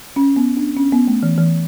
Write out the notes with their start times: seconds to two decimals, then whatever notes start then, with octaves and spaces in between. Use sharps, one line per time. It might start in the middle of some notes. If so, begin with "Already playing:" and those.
0.16 C#4
0.36 B3
0.57 D4
0.77 C#4
0.92 B3
1.07 A3
1.23 E3
1.38 E3